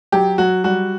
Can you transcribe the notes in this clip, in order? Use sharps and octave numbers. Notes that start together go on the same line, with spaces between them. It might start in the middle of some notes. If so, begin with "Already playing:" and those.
F#3 G4
F#3 F#4
G3 F#4